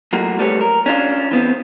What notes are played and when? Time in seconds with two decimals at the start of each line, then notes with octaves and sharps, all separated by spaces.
0.13 F#3 A3 A#3 F4
0.39 G3 A3 B4 C#5
0.61 A#4
0.86 C#4 D4 F4
1.31 E3 B3 C4